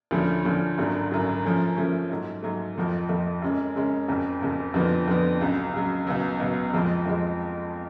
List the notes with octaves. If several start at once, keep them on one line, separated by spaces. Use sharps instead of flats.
D2 D3 F3 A3 C#4
D2 D3 F3 A3 C#4
G#1 F#2 D3 F#3
G#1 F#2 D3 F#3
F#2 F3 A3 C#4
F#2 F3 A3 C#4
G#2 F#3 A3
G#2 F#3 A3
F2 F3 A3
F2 F3 A3
F#2 C#3 G#3 C#4
F#2 C#3 G#3 C#4
F#1 F2 C#3
F#1 F2 C#3
F2 D3 F3 B3
F2 D3 F3 B3
C#2 C#3 F#3
C#2 C#3 F#3
C#2 B2 F#3
C#2 B2 F#3
F2 F3 G#3
F2 F3 G#3